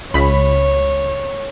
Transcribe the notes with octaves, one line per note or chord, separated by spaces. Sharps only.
C#2 C#5 B5